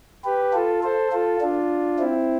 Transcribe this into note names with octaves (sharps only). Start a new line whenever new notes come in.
G4 B4
F4 A4
A4 C5
F4 A4
D4 F4
C4 E4